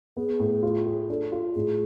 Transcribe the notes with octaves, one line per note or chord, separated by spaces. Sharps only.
B3 G#4
A2
F4
G#4
D4 A4
F4
A2 G#4